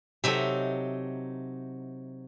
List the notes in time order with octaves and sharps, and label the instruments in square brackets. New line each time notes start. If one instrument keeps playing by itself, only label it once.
[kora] C3 A4 [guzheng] F#3 D#4 E5